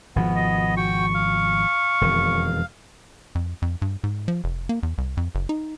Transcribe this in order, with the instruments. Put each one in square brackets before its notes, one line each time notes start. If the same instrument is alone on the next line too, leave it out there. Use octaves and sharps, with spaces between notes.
[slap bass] G#1 B2 F3 [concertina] B3
[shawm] D#5
[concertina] F#4 G5 [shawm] C#6
[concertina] F5
[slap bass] E1 F2 D#3
[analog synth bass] F2
F2
G2
G#2
F3
F1
A#3
E2
C2
F2
F#1
D#4